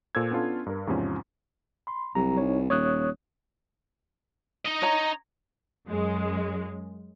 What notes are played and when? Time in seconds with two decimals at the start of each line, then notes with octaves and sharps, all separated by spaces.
0.15 A#2 A4 C5 E6 G#6
0.31 B3 C#4 D4 F4 A4
0.66 G2 A#4
0.87 E2 G#2 C3 F3 C#4
1.87 B5 C6
2.15 C2 F#3 G4 A#5
2.38 D#4 C#5
2.70 D#1 C#5 D#6 F#6
4.65 D#4 D#5
4.82 C#5 A#5
5.88 F#2 G#3